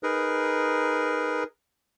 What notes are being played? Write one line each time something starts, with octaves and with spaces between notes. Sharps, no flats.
D#4 G#4 A#4 B4